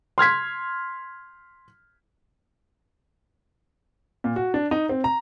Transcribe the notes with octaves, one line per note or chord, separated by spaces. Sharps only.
C6 F6 G#6 B6
A#2
F#4
D4
D#4
C4
A#5